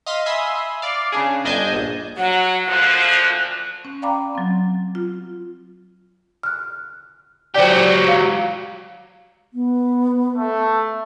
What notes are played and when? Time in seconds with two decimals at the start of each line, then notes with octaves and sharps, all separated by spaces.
0.06 D#5 F5 C6 B6 D#7
0.26 E5 G#5 B5 C6 D#6
0.82 D5 F5
1.12 C#3 D4 G#4
1.44 G1 D4 D#5 G#5 A5 G6
1.72 A#1
2.17 F#3 F#5
2.67 D2 A#2 F3 F#6
3.85 C#4
4.02 D5 F5 G5 A#5 B5 D6
4.35 F#3 C4
4.95 F4
6.43 F6 F#6
7.55 F#3 G4 C5 D5
8.08 F5
9.53 B3
10.36 A3